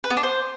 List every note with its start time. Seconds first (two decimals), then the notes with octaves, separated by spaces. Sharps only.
0.04 B4
0.10 B3
0.17 D4
0.23 C5